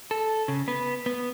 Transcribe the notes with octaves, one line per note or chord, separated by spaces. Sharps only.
A4
C#3
B3
B3